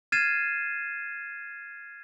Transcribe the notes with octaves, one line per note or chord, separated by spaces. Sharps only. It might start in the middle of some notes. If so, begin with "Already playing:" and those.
F6 G#6 A6 C7 D#7 E7